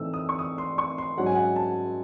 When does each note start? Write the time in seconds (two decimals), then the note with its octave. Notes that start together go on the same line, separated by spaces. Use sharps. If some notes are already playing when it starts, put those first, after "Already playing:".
Already playing: A2 E3 A3 C4 D#4 E6
0.14 D#6
0.29 C#6
0.39 D#6
0.58 C6
0.78 C#6
0.98 C6
1.17 G#2 F#3 C#4 F#5
1.26 G#5
1.35 F#5
1.56 A5